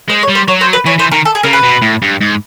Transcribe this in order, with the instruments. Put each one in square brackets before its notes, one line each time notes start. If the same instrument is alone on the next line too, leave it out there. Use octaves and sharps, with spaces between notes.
[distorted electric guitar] G#3 [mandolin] C5
[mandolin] C#5
[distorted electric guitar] G3
[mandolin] C5
[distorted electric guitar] F#3 [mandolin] C#5
[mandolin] C5
B4
[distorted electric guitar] E3 [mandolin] C#5
[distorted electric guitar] E3 [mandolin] C5
[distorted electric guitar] D#3 [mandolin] A#4
[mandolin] A4
G#4
[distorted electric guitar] C#3 [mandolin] A#4
[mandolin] B4
[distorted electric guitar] B2
A2
G2
G#2